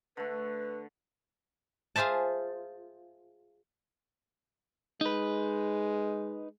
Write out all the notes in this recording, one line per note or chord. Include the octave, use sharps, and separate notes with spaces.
D3 A3 B4
F4 G#4 C5 E5 A5
G#3 D#4 B4